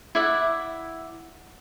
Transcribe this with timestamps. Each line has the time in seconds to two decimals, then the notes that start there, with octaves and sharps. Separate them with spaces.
0.15 E4 D5 E5 F#5